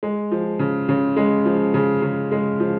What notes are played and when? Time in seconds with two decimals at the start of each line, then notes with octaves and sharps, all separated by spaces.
0.03 G#3
0.31 F3
0.59 C#3
0.89 C#3
1.17 G#3
1.45 F3
1.74 C#3
2.02 C#3
2.32 G#3
2.60 F3